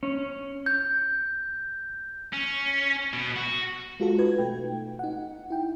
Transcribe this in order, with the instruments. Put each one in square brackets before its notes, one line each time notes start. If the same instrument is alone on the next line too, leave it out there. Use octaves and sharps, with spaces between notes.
[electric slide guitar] C#4
[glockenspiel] G6
[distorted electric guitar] C#4
B2
F#4
[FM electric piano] G#3 F4 F#4 A4
D#4 B4 G#6
B2 A3 G5
D#4 F#5
E4 G5